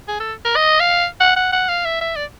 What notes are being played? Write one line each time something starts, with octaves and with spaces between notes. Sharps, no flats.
G#4
A4
A#4
D#5
F5
F#5
F#5
F#5
F5
E5
E5
D5